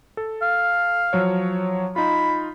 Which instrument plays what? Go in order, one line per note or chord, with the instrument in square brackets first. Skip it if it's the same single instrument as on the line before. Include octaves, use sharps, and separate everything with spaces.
[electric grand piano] A4
[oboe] F5
[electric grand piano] F3 F#3 C#5
[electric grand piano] D#4 F4 [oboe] B5